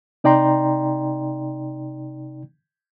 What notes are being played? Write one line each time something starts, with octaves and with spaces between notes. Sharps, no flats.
C3 D#4 D5 G5 A#5 C6